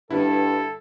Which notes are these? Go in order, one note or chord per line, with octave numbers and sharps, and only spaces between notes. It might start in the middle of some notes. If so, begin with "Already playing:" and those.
G2 D3 G3 E4 A4 B4